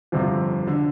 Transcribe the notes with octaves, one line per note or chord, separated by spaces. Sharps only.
G1 F2 C3 F3
D3